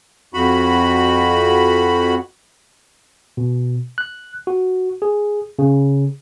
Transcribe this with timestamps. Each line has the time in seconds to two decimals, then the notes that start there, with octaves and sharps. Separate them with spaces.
0.34 F2 F#4 B5
3.37 B2
3.98 F#6
4.47 F#4
5.02 G#4
5.59 C#3